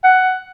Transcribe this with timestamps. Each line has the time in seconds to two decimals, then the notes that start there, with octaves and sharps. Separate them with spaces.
0.05 F#5